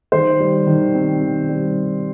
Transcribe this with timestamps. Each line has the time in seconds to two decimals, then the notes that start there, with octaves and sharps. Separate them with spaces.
0.12 D#3 C5
0.40 G3
0.67 D#3
0.95 C4
1.22 D#3
1.49 G3